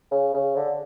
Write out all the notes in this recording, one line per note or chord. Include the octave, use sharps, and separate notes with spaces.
C#3
C#3
D3